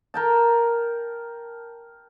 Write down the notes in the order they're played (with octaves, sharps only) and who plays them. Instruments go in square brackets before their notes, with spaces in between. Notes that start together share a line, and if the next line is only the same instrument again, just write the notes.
[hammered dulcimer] A#4 G5 A5